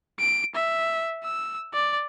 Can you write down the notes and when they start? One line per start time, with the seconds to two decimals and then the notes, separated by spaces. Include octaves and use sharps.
0.19 D7
0.55 E5
1.24 E6
1.74 D5